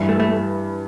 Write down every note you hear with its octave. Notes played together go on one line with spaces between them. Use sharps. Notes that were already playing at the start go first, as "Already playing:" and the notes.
Already playing: G2 E3 G3
A3
A3